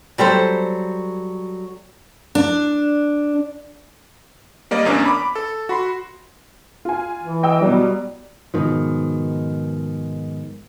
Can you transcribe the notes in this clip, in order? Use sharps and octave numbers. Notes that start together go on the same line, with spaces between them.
F#3 G3 A4 C5
D4
G3 A#3 D5 D#5
A1 E2 A#3 C#4 D4 D5
B5 D6
A4
F#4 B5 C6
F4 G#5
E3
D#5 G5 E6
B2 F#3 G3 E4
G#2 B2 D#3 F3